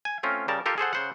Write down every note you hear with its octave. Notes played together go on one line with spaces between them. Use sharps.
G#5
A3 C4 C#4 F4
C#3 G3 A#4 A5
F4 G4 A4 A#4
G#4 A4 C5 F#5
C#3 C5 F#5